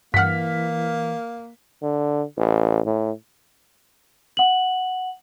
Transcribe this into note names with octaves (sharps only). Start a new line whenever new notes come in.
G2 E3 A#3 F#5 F6 B6
D3
A1
A2
F#5 F#7